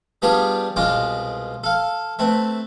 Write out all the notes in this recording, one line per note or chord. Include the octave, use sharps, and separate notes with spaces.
G3 B3 D4 F4 G4 G#4
C2 B2 G#3 F4 D6
A4 F5
A3 C4 B4